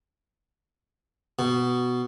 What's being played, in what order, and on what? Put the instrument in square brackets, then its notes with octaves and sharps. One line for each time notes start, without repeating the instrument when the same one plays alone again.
[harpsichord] B2